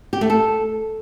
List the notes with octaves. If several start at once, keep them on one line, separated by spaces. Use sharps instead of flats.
G4
A3
A4